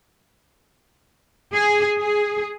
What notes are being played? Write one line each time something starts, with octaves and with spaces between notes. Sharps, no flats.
G#4
G#4